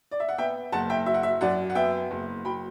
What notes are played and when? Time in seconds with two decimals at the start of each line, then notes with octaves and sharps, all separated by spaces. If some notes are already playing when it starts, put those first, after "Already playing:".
0.11 D5
0.20 E5
0.29 F#5
0.38 B3 E5 G5
0.72 F#1 F#5 A5
0.90 E5 G5
1.06 F#3 E5
1.14 F#5
1.23 E5
1.41 F#2 D5 F#5
1.70 F#5
1.75 B3 E5 G5
2.11 F#1
2.44 F#3 G5 B5